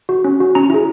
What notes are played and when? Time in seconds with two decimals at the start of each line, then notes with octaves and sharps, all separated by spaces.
0.09 F#4
0.24 C#4
0.40 F#4
0.55 C#4 A#5
0.70 E4 G#4